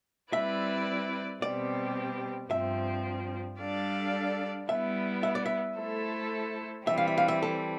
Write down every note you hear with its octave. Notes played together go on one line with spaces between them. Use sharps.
G3 C4 E4 B4 D5 E5
B2 G3 C4 G4 D5
G2 F3 C4 E5
G3 D4 A4 D5 F5
G3 B3 E4 E5
E5
D5
E5
A3 E4 A4 C5
E3 G3 C4 E5
F5
E5
F5
E5
A4